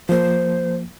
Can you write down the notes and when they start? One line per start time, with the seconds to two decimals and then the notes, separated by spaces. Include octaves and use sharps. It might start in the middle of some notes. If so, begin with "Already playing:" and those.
0.09 F3 A#3 C5